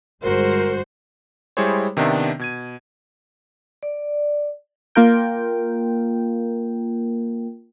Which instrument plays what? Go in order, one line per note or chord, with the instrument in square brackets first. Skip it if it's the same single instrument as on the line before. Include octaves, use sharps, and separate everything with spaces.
[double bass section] G1 G#3 [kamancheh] F#4 [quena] A#4 [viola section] C5
[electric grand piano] G3 G#3 E4 G#4 C5 C#5
C3 D#3 B3 D4 E5
B2 G#6 D#7
[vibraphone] D5
[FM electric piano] A#3 F4 A#4 G5